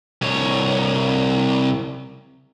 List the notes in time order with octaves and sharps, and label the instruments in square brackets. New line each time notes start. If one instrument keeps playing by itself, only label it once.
[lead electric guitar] C2 C#5